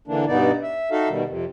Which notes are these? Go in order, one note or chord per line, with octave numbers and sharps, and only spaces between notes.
D3 E3 A#3 D4
G2 B2 B3 D#4 D5
E5
D#4 F#4 A4 E5 F5
B2 D#3 G3
F2 C3